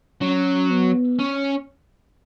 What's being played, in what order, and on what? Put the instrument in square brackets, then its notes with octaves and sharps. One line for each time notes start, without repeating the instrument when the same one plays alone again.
[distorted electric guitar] F#3 [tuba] C#4
[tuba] B3
[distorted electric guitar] C#4